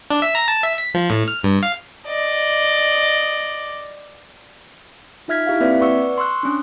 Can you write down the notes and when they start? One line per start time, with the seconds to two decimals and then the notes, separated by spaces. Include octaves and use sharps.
0.10 D4
0.22 E5
0.35 A#5
0.48 A5
0.63 E5
0.78 B6
0.94 F3
1.10 A2
1.28 F6
1.44 G2
1.63 F5
2.08 D5 D#5
5.28 D#4 F4 E5 F6 G#6 B6
5.47 E4 G4 F5
5.60 A#3 C4 B4 D5 E5 B6
5.80 B4 D5 F#5 C#6 E6
6.18 C6 C#6 E6 F#6
6.43 C#4 D4